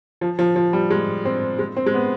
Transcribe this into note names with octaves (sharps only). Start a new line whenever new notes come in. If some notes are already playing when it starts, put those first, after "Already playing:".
F3
F3
F3
G3
G#3
C4
G#3
C4
G#3
B3